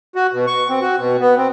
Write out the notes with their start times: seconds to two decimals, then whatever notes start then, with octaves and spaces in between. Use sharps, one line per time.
0.15 F#4
0.33 B2
0.47 C#6
0.69 C4
0.82 F#4
0.98 B2
1.20 B3
1.37 C4